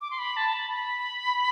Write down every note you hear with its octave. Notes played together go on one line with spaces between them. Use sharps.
D6
C6
B5
A5
B5
B5